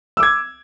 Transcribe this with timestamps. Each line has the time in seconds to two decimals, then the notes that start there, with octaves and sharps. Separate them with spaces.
0.17 E6
0.20 D6
0.23 G#6